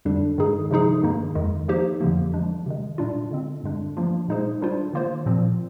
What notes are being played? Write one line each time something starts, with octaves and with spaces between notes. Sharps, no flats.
F2 D3 G3 D4
G2 D#3 G#3 D#4 G#4
C3 F3 G#3 D#4 G#4
G2 D#3 A#3 D#4
F2 D#3 G#3
F3 A#3 D#4 G4 C5
F2 D3 F3 A#3
F3 G#3 D4
C3 D#3 G#3
A#2 G3 D4 F4
D3 G#3 C4
G2 D3 G#3 D4
F3 A#3 D4 F4
A#2 G#3 D#4 G#4 C5
D#3 G3 D4 F4 C5
D#3 A#3 F4 C5
A#2 F3 C4